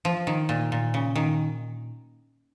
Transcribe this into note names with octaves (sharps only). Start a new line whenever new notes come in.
F3
D#3
A#2
A#2
C#3
D#3